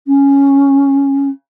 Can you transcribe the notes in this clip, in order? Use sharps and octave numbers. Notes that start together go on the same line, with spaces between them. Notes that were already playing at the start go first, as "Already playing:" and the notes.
C#4